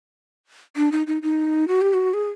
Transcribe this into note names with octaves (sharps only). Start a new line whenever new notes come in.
D4
D#4
D#4
D#4
F#4
G4
F#4
G#4